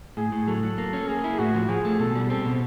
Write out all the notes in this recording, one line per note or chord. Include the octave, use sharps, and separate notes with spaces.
A2 G#4
A2
F#3 A4
F#3
A#3
C#4
A#3 G#4
E4
A2 F#4
F3
F3 G#4
A3
B2 A4
G3
C4 A4
B2